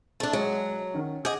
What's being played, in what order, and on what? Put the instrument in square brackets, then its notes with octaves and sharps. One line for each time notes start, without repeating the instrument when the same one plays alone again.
[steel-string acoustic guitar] A3 D4
[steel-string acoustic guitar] F#3 [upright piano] G#3
[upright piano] D#3 C#4
[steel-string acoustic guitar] G#4 D#5 [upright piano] F#5 D6 G6